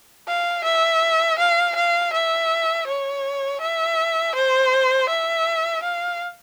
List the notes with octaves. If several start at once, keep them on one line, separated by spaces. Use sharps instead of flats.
F5
E5
F5
F5
E5
C#5
E5
C5
E5
F5